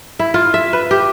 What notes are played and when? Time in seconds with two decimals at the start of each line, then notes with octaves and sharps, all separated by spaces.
0.19 E4
0.34 F4
0.54 E5
0.73 B4
0.91 G4